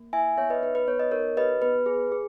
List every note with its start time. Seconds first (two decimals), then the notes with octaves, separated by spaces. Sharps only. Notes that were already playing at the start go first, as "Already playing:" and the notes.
Already playing: A#3
0.13 E4 E5 G#5
0.37 B3 C#5 E5
0.50 B4 D#5
0.62 D#4 B4
0.75 B4
0.88 B3 C#5
1.00 D#5
1.11 D#4 A#4 C#5
1.37 G4 B4 D#5
1.62 B3 B4
1.86 G#4
2.12 G#4